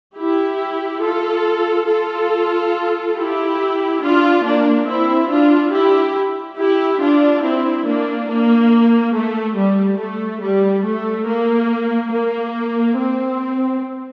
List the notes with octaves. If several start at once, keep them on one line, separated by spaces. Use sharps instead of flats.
E4 G4
F4 A4
F4 A4
E4 G4
D4 F4
A#3 D4
C4 E4
D4 F4
E4 G4
E4 G4
D4 F4
C4 E4
A#3 D4
A#3
A3
G3
A3
G3
A3
A#3
A#3
C4